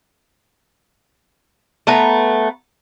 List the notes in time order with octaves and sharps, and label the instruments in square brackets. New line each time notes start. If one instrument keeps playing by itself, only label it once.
[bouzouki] A3 B3 B4 A#5